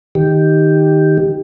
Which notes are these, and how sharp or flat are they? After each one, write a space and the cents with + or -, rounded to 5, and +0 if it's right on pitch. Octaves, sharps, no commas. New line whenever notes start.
D#3 +0 G4 +0